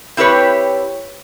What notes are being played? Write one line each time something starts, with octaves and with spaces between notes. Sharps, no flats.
C4 E4 G4 B4 C#5